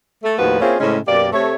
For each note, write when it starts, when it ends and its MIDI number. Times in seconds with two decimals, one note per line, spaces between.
0.22 0.36 57
0.39 0.59 39
0.39 0.59 45
0.39 0.59 53
0.39 0.59 66
0.39 0.59 71
0.60 0.75 58
0.60 0.75 60
0.60 0.75 61
0.60 0.75 64
0.60 0.75 65
0.60 0.75 68
0.80 0.97 45
0.80 0.97 49
0.80 0.97 56
0.80 0.97 60
0.80 0.97 61
1.08 1.28 42
1.08 1.28 47
1.08 1.28 58
1.08 1.28 67
1.08 1.28 74
1.32 1.55 48
1.32 1.55 57
1.32 1.55 73